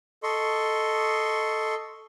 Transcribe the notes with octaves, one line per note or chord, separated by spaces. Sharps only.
A4 D#5 C6 C#6